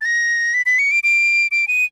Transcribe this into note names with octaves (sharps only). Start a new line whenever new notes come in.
A6
A#6
B6
B6
C#7
D7
D7
D7
D#7